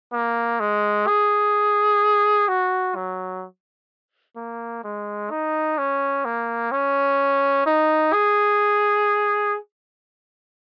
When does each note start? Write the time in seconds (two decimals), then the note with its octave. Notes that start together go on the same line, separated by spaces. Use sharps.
0.13 A#3
0.60 G#3
1.07 G#4
2.49 F#4
2.96 F#3
4.36 A#3
4.84 G#3
5.31 D#4
5.78 C#4
6.25 A#3
6.72 C#4
7.66 D#4
8.13 G#4